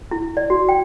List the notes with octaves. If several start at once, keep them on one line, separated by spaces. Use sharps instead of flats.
E4
D5
F#4
G5